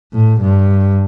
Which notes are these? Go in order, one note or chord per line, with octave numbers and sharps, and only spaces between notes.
A2
G2